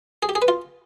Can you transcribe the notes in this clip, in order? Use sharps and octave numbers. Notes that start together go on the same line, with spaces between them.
G#4
G4
G#4
B4
F4